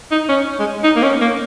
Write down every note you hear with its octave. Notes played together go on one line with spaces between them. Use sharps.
D#4
C#4
G#3
D#4
A#3
C#4
A#3